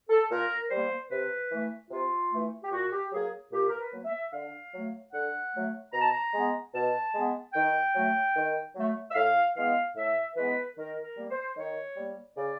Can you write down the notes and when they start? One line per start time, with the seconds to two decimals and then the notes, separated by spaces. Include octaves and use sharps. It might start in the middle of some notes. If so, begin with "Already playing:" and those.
0.10 A4
0.30 A#2 A#4
0.70 G3 A#3 C5
1.10 C3 B4
1.51 E3 A3
1.91 C3 F4
2.31 E3 A3
2.64 G4
2.71 A#2 F#4
2.92 G4
3.12 F#3 A#3 G#4
3.52 A#2 G4
3.68 A#4
3.79 B4
3.93 F#3 A#3
4.05 E5
4.32 D3 F5
4.73 F#3 A3
5.13 D3 F#5
5.54 F#3 A3
5.93 B2 A#5
6.01 A5
6.10 A#5
6.34 G#3 B3
6.74 B2 A5
7.15 G#3 B3
7.54 D#3 G5
7.94 F#3 A3
8.35 D#3
8.76 F#3 A3
9.11 E5
9.15 A2 F5
9.56 E3 G#3 B3 F5
9.96 A2 E5
10.36 E3 G#3 B3 B4
10.77 D#3 A#4
11.04 A#4
11.17 G3 A#3
11.30 C5
11.57 D#3 C#5
11.97 G3 A#3
12.37 C#3 D5